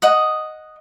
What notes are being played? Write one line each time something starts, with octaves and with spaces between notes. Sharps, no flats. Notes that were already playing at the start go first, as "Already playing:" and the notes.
D#5 F#5 D#6